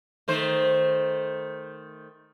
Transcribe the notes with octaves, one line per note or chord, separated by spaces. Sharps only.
D#3 A3 C5